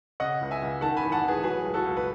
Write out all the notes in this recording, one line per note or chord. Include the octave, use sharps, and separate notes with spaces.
C#3 D#5 F#5
C#2
E5 G#5
C#2
D#3 F#5 A5
G#5 B5
A1
F#5 A5
A1 G#4 B4
F#3 G#4 B4
C#2
F#4 A4
C#2
B4